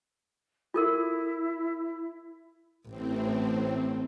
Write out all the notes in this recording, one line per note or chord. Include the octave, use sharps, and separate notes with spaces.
E4 F4 A4 A#4
A1 A2 C4